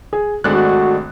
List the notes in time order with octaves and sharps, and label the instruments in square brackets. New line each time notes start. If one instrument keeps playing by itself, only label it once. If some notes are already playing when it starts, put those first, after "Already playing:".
[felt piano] G#4
[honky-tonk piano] G#1 D4 F#6 [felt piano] G#3 A3 [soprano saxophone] F#4